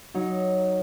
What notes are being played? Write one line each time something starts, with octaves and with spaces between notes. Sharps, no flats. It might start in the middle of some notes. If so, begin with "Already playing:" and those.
F#3 D#4